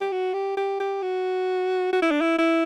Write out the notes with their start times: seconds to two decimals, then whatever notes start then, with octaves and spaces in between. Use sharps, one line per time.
0.01 G4
0.12 F#4
0.33 G4
0.57 G4
0.80 G4
1.02 F#4
1.92 F#4
2.02 E4
2.11 D4
2.21 E4
2.38 E4